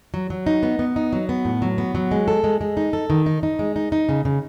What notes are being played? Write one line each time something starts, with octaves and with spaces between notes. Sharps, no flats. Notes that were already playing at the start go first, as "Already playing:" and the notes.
F#3
F#3
D#4
B3
B3
D#4
F#3
B3
A2
F#3
B3
F#3
G#3
A4
G#3
G#3
D#4
A4
D#3
D#4
D#4
G#3
D#4
D#4
C#3
C#3